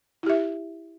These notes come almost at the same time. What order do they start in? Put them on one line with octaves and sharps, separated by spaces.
E4 G4 E5